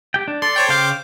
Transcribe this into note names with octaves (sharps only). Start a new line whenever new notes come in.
G4 G5
D4
A4 D5 C6
C5 C#5 G5
C#3 C5 F5 G5 D6